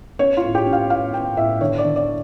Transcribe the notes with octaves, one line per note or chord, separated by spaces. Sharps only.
C#4 C#5
F4
A2
G4
C#4
F5
A2 F5
C#4 G5
A2 E5
D3 C#5
D5
D3
D5